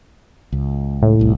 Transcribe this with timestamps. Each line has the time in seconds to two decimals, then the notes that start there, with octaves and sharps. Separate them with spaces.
0.52 C#2
1.02 A2
1.19 D#1 C2